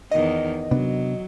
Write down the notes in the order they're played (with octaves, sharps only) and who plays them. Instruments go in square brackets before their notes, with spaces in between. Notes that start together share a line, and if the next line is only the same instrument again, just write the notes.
[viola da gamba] E2 D#3 [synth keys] D#5
[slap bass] C3 B3 D4 [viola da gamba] F#3